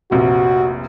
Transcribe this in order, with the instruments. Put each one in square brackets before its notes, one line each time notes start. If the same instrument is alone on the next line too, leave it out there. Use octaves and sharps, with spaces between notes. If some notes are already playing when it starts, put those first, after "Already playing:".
[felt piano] F1 A#1 C3 [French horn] F#4